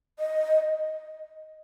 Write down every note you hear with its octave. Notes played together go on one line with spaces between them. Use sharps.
D#5